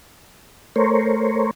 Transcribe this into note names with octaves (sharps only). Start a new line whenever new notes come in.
A3 A#4 C5 C#5